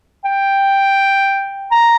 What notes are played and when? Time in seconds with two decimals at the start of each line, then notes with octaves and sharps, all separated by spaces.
0.25 G5
1.71 A#5